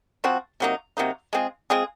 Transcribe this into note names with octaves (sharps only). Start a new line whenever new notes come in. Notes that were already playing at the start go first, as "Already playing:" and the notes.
F3 C4 F#4
C3 F#3 A#3 D#4
C3 F#3 A#3 D#4
G#3 C4 F4 G#4
G#3 C4 F4 G#4